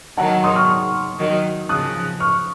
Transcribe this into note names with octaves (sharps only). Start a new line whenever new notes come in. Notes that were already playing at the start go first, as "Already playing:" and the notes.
D#3 F#3 F#5 A#5
C6 D#6
C#6 F6
D#3 F#3
C#3 F3 D#6 F#6
C#6 F6